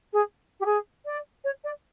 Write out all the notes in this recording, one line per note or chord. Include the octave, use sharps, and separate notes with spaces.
G#4
G4
G#4
D5
C#5
D5